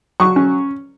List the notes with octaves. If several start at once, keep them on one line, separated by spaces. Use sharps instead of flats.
F#3 C#6
C#4